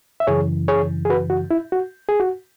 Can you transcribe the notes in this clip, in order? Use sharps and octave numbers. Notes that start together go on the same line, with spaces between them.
E5
F#2 C#3 E3 G#4 C#5
G#4 C#5
G#4
F#4 B4
F#4
E4
F#4
G#4
F#4